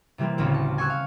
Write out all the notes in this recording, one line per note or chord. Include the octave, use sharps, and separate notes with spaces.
C3 E3 G3 A#3 C4
A1 D2 C#3 C4 C#4
A5
G#5 C#6 E6 F#6 G#6
F5